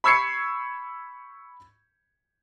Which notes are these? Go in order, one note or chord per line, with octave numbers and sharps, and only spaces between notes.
B5 C#6 E6 G#6 C7 C#7